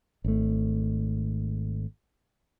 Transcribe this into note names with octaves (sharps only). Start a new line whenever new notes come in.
G#1 A3